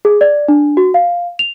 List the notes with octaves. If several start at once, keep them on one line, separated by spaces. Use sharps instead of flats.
G#4
D5
D4
F#4
F5
F7